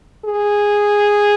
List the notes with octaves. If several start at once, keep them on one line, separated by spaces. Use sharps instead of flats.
G#4